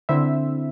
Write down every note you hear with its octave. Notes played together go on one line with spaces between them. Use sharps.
D3 C4 E4 C5 E5